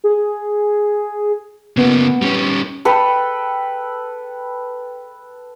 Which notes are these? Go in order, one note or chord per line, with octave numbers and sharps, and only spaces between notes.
G#4
C#3 A#3 B3
G3 C#4
A4 B4 G5 B5